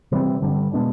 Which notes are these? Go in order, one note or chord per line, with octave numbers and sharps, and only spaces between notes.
C3 E3 G3 C4
G2 D3 G3
B2 G#3 B3 D4